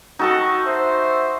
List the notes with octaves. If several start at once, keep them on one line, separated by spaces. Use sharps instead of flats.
D#4 F#4 A4 A5
F#4 C5 E5